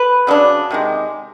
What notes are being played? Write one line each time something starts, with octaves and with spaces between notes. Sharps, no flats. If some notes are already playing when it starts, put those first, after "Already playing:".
Already playing: B4
C#3 F#3 D4
C3 D#3 G#3